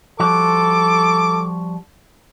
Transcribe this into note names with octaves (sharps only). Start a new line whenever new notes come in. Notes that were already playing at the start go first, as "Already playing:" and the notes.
F3 G3 F#4 A4 D6